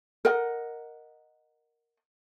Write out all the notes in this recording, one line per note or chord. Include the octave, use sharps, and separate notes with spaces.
A#4 D#5 F#5